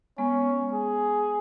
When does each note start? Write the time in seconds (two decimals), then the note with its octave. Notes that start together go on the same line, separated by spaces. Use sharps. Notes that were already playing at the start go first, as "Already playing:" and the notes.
0.18 G#3 B3 C#4
0.73 G#4